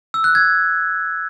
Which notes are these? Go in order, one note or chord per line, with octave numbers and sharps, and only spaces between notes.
E6
F#6
G#6